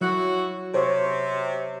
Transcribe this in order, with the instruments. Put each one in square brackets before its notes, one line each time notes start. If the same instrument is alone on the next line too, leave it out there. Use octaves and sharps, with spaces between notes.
[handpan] F#3 [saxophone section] E4 F#4
[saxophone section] C3 [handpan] C5 C#5